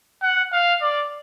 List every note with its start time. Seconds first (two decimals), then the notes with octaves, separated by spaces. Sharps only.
0.22 F#5
0.52 F5
0.82 D5